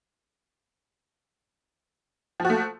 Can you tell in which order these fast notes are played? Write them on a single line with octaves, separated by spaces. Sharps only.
F3 F#4 A3